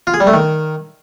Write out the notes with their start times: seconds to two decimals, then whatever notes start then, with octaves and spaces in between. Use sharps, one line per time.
0.07 F4
0.14 G#4
0.20 G3
0.27 A3
0.34 D#3